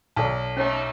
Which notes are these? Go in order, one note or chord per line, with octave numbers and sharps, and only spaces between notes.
B1 A4 D5 A5
A3 C#4 D#4 C#5